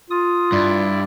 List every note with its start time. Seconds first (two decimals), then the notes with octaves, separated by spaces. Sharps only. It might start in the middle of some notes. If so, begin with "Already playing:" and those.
0.10 F4 D#6
0.52 G2 E4 D5